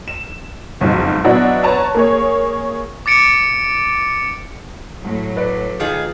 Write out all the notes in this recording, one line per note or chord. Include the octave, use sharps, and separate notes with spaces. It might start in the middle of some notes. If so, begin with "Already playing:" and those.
E7
F#1 B1 F2 G#2
B2 F#3 D4 E4 F#4
B4 C#5 A5 A#5
A#3 G#4 C#5
D6 A6 C#7 D7
A2 F#3
B4 D5
D#3 F4 G#4